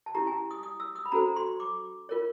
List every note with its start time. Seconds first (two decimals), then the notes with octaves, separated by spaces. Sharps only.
0.06 A5
0.15 C#4 E4 G4 A#5
0.27 G#5
0.51 D#6
0.63 D#6
0.80 E6
0.96 D#6
1.05 B5
1.12 C#4 F#4 A4 C5 A#5
1.36 C6
1.60 D6
2.09 F4 A#4 C#5